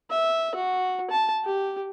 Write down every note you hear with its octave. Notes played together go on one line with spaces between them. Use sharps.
E5
F#4
A5
G4